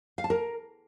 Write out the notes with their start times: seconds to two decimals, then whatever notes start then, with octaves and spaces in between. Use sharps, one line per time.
0.18 F5
0.24 A5
0.30 A#4